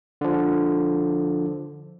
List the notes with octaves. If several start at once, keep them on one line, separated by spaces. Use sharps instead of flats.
D3 F3